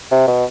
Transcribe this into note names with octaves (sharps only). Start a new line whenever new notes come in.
C3
B2